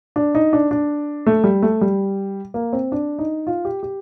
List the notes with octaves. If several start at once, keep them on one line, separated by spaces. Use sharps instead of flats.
D4
D#4
D4
D4
A3
G3
A3
G3
A#3
C4
D4
D#4
F4
G4
G4